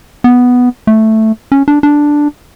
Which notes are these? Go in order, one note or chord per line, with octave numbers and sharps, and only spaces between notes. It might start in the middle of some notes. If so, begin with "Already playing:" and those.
B3
A3
C#4
D4
D4